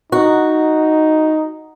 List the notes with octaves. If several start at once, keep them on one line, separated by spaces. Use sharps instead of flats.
D#4 F#4